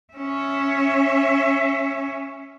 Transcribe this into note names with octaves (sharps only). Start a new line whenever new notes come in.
C#4 E5